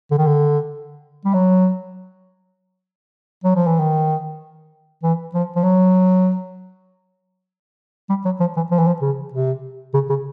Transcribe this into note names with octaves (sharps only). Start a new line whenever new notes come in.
D3
D#3
D3
G3
F#3
F#3
F3
E3
D#3
E3
F3
F3
F#3
G3
F#3
F3
E3
F3
E3
F3
C#3
C3
C#3
C#3